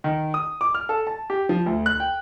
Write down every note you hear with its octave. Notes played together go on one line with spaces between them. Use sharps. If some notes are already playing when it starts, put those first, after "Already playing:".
D#3
D#6
D6
F6
A4
A5
G4
F3
D2
F#6
G5